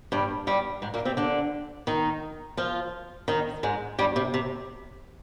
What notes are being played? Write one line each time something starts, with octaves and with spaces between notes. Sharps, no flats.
G2 G3
G2 G3
G#2 G#3
A#2 A#3
C3 C4
D3 D4
D#3 D#4
F3 F4
D#3 D#4
G#2 G#3
G2 G3
C3
C3